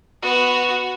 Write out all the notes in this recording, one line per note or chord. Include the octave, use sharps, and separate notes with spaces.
B3 F#4